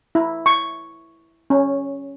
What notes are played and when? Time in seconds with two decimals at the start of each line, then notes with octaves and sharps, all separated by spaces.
0.15 E4
0.46 C#6
1.50 C#4